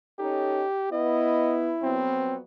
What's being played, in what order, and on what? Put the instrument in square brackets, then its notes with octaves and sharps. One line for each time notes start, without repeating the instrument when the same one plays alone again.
[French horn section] C#4 D#4 A4 [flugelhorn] G4
[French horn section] B3 [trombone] E4 [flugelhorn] D#5
[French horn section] F2 F#3 B3 [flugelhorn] C4